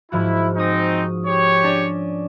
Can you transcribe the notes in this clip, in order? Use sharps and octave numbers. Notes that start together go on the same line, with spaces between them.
G#2 F3 E4 F#4
G#3 C4 D#4 C#6 D#6
G4 C#5
C#4 D4